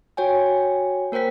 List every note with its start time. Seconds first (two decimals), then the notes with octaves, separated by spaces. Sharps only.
0.17 F#4 C#5 G5 G#5
1.12 A#3 A#4 C5 G5 B6